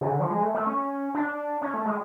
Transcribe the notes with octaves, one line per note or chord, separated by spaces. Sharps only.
C#3
D3
F3
G#3
A3
A3
C#4
D4
C#4
A3
G#3